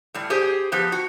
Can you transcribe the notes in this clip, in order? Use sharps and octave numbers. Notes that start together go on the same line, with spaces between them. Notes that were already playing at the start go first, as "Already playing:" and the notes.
A2 G3
G4 G#4 C5
F3 B3 G4
F#4